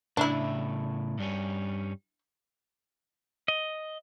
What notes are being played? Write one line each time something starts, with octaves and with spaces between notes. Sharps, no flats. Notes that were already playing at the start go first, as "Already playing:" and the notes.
A2 C#3 D4 E4 E5
G2 G3 C#4
D#5